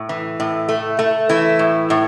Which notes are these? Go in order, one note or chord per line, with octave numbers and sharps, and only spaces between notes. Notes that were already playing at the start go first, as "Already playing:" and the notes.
Already playing: A2
E3
A2
A3
A3
E3 E4
A2
A2